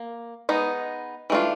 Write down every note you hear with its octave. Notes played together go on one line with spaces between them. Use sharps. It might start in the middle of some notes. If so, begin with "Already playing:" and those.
Already playing: A#3
G#3 B3 D#4
E3 A3 D4 F4